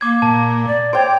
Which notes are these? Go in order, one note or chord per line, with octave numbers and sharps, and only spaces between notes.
A#3 D6 G#6
A#2 A5
D5
C5 C#5 G5 D6